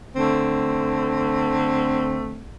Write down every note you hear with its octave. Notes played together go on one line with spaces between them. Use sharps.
D3 A3 C4